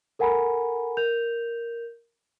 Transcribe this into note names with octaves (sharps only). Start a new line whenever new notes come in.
A4 A#4 F#5 G#5 A#5 B5
A#4 G6 F7